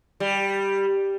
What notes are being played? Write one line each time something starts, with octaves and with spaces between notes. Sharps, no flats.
G3